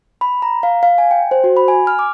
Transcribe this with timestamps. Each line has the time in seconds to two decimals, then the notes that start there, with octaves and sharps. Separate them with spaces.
0.21 B5
0.42 A#5
0.63 F5
0.83 F5
0.98 G#5
1.11 G5
1.31 C5
1.44 F#4
1.57 B5
1.68 G#5
1.87 F6
1.99 D6